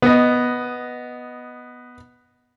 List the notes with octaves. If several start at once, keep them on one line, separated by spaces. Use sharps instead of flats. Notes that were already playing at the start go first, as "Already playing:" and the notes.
B3 D#5